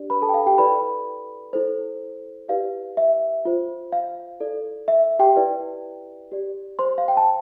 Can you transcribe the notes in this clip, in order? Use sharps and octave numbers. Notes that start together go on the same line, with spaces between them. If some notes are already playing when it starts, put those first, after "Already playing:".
Already playing: D4 G4 D5
B4 B5
A4 A5
G5
F5
G4 G5
E4 A4 B4 D5 B5
E4 A4 C5
E4 G4 B4 D5 F5
E5
F4 C5
F5
E4 A4 D5
E5
G4 G5
E4 B4 D5
G4 D5
C5 C6
F5
G5
A5